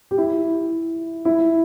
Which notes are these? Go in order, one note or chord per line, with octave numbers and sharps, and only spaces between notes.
G4
E4
E4